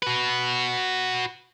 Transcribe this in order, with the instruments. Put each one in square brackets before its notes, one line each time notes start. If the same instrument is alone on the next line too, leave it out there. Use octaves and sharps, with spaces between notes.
[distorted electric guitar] F#4 B4